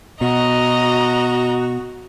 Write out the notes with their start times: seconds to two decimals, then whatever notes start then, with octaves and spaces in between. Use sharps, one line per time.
0.21 B2 F#4 D#5 A#5